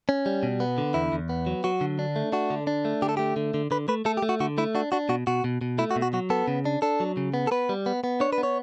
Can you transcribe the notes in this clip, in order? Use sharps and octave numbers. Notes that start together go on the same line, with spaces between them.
C#4
G3
B2
B3
D3
E2 E4
E2
B3
F#3
F#3 F#4
D3
D4
A3
D4 F#4
D3
D4
A3
D3 G4
A4
A3 G4
D3
D3
D3 B4
A3 B4
A3 A4
G4
A3
F#4
D3 F#4
A3 E4
D4 F#4
D4 F#4
B2 F#4
B2 F#4
B2
B2
A3 E4
F#4
B2
F#4
F#3 F#4
B3 A4
C#3
D4
D4 A4
F#3
C#3
B3
A4
B3 B4
G3
B3
B3
D4 C#5
B4
B3
C#5